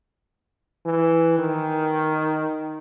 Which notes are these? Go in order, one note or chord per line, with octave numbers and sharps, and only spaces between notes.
E3
D#3